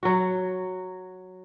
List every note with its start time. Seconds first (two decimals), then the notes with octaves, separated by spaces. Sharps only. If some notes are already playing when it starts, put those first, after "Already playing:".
0.03 F#3 F#4